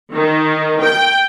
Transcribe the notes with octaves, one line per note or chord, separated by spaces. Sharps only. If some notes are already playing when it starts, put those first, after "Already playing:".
D#3
G5